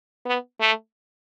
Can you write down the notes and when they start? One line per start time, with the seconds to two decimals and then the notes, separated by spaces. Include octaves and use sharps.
0.25 B3
0.60 A3